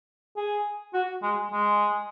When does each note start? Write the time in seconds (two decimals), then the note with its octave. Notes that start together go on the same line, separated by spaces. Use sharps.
0.37 G#4
0.94 F#4
1.22 G#3
1.51 G#3